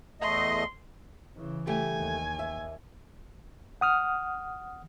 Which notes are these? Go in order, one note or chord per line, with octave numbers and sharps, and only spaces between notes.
E2 A3 D#5 C6
C#3 E3
G3 A3 G4 G#5
D#2
E5
F#5 D#6 F6